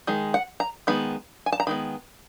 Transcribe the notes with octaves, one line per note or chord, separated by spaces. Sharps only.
D#3 G#3
F#5
A#5
D#3 G#3 B3 B5
G#5
A5
A#5
D#3 G#3 B3 B5